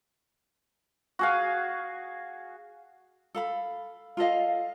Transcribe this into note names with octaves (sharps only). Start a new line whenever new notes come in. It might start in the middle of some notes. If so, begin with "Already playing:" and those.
F#4 G#4 F5
A4 F5 B5
F4 A4 D#5 F5